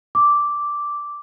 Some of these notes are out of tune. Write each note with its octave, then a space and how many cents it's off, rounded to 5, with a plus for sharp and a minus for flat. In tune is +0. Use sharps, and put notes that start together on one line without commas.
D6 -5